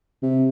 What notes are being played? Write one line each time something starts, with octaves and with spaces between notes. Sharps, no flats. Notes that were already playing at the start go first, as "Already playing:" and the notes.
C3